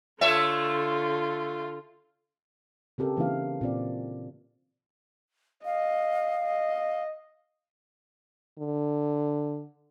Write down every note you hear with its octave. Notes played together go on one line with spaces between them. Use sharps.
D3 A3 F4 C#5 E5
C#3 C4 G4 A4 A#4
C#3 E3 A#3 D4 E4 F5
A#2 C4 D5
D#5 F5
D#5
D3